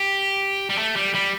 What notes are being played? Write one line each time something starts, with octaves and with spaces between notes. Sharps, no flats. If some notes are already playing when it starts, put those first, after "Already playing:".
Already playing: G4
G3
A3
G3
G3